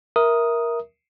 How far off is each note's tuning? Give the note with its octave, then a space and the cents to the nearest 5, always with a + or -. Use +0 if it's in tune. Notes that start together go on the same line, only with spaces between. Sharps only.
A#4 +10 E5 +0 D#6 +0